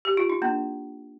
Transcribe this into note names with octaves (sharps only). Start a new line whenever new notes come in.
G4
F4
D#4
A#3 D4